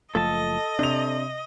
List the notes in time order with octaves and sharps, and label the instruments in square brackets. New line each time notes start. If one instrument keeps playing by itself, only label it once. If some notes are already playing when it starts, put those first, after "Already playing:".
[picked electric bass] F#1 F3 A3 [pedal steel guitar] A4 A5 [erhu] D#5
[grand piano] C3 F7 [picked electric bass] D4